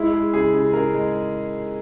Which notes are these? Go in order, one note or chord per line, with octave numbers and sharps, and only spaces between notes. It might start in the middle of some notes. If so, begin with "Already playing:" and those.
Already playing: G#3 E4
G#3
C#3 G#4
C#3
C#3 A#4
G#3